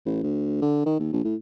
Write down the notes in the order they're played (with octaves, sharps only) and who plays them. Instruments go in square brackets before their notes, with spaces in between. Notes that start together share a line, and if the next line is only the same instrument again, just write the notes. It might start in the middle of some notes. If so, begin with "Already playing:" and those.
[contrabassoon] A1
D2
D3
D#3
D#2
A#1
A2